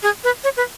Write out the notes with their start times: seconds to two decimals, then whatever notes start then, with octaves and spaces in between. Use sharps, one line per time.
0.03 G#4
0.24 B4
0.44 C#5
0.57 B4